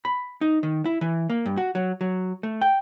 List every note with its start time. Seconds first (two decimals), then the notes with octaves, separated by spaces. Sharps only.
0.05 B5
0.41 D#4
0.63 D#3
0.86 E4
1.01 E3
1.30 A#3
1.46 G2
1.57 F#4
1.75 F#3
2.01 F#3
2.43 A3
2.61 G5